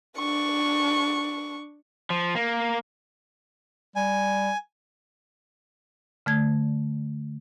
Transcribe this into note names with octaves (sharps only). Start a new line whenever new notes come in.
D4 C#6
F3
A#3
G3 G#5
D3 A3 G#6